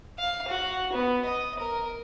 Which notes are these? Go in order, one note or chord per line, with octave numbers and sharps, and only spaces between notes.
F5
F#4
B3
D#5
A#4